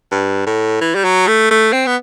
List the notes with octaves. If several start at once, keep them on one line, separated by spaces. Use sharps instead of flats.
G2
A2
E3
G3
F#3
A3
A3
C4
B3